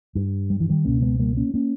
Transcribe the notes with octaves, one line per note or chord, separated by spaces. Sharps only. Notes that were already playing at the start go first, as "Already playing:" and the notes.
G2
G3
E3
D#3 G3
C#2 B2 A#3 C#4
G#3 B3
G3 A#3
A#3 C#4
A#3 C#4